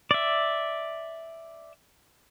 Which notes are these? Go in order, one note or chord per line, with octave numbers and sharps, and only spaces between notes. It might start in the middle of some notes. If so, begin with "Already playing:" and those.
D5 E5